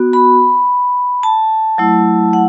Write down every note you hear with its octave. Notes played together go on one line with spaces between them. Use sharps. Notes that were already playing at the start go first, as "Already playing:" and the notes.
Already playing: B3 F#4
B5
A5
F#3 A3 E4
F#5